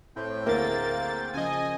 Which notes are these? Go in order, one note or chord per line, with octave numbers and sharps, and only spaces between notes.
A2 C4 G5
D2 A#3 E4 G#4 A#4 A6
C#3 F3 D#5 G#5